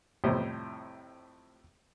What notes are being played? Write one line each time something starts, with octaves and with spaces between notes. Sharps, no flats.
F2 A2 C3 G3 C5